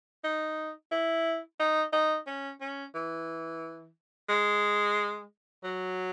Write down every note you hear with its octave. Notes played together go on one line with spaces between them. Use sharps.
D#4
E4
D#4
D#4
C#4
C#4
E3
G#3
F#3